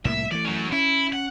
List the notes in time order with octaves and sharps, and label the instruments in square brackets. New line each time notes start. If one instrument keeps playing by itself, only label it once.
[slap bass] C2 A2 A#3 [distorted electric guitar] E5
[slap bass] E3 A3 [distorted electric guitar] D5
[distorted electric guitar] F#3 C#4
[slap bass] C#4 [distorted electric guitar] E4
[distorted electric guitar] F#5